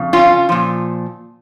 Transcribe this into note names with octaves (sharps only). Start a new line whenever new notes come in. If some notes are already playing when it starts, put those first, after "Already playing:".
Already playing: F2 C#3
C#4 F4
A#2 F3